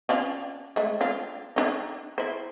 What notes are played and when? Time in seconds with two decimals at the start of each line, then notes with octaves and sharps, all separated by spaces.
0.09 C#4 D4 F4
0.76 G#3 A3
1.01 D4 F4
1.56 D4 D#4
2.18 E4 C5